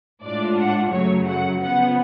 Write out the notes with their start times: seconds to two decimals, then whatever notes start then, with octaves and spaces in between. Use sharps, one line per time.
0.24 A2 G#3 D4 F4 D5
0.58 F#5
0.92 F#2 C#3 F#3 A3 C#5
1.27 F#5
1.61 C#3 F3 B3 F#5